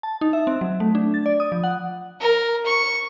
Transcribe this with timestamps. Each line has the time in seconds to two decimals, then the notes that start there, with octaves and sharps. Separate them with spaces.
0.03 A5
0.21 D#4
0.33 E5
0.47 C4
0.61 F#3
0.80 A3
0.95 D4
1.14 A6
1.26 D5
1.40 D#6
1.52 F3
1.64 F#5
2.20 A#4
2.66 C#6